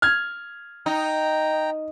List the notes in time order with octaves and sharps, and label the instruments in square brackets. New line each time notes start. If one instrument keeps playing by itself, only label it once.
[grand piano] F6 G#6
[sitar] D#4 [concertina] G5 A#5